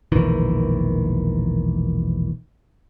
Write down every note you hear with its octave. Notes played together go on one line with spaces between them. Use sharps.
E1 A#1 D#3 E3